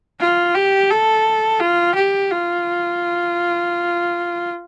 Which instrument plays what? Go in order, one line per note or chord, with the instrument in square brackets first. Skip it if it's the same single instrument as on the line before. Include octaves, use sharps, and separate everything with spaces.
[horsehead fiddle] F4
G4
A4
F4
G4
F4